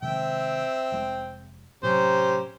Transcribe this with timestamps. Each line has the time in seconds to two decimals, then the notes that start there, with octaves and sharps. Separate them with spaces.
0.02 C3 D#3 G#3 C4 E5 G5
0.92 F1 G#3
1.83 A2 C3 F#3 C#4 G4 C5 A#5